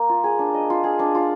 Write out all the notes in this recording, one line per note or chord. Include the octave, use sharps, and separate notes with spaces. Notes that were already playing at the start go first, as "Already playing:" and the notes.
Already playing: A#3
F4
G#4
D4
D#5
F4
G#4
D4
F4